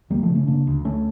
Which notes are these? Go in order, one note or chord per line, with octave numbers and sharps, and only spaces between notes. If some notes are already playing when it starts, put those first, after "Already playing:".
D2 G3 A#3
F3 A3
C#3
A3 C#4
C#3 A#3 D4
D2
D2 A3 C#4